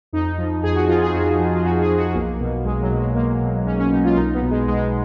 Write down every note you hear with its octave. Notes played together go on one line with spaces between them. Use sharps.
F2 D#4
F3
F2 G#4
F#4
F3 F4
G#4
F2 F#4
F3
F4
F2 F#4
G#4
F3
F#4
B1 A#3
B2
B1 G#3
F#3
B2
G#3
B1 A#3
B2
B1 C#4
C#4
B2 D#4
F4
B1 D#4
B3
B2
G#3
B1 G#3